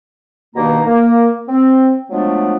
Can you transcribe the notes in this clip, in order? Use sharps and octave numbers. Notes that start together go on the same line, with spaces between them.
G2 B2 D#3 A#3 D#4 A#5
A#3
C4
F3 F#3 G#3 A3 B3 D4